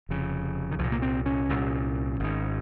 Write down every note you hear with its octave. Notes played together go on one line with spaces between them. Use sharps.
F1 F2 C#3
D#3
C2 A#2 F3
A#3
C4
C#4
C2 A#2
G#1 G#2